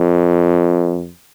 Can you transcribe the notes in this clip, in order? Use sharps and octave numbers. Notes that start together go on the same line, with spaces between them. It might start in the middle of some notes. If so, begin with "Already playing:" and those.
Already playing: F2